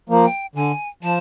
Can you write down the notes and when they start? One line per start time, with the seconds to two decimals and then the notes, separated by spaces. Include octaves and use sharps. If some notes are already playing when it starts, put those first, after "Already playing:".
0.09 F3 A#3
0.25 G5
0.55 D3 G#5
1.03 F3 A5